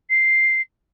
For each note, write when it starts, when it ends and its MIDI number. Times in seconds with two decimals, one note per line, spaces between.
0.10 0.61 96